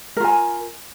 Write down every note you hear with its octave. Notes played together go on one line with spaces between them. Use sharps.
F4 A#4 G#5